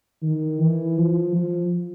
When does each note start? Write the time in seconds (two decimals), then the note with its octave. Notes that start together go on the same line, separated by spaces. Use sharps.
0.23 D#3
0.60 E3
0.97 F3
1.35 F3